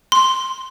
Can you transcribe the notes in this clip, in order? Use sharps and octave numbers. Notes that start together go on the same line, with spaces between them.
C6